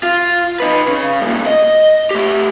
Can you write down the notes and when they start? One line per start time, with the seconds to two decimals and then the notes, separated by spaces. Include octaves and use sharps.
0.03 F4
0.60 D#4 B4
0.88 C#3
1.21 G2 A#2
1.47 D#5
2.11 A3 G4